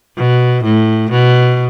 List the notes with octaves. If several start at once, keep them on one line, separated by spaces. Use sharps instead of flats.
B2
A2
B2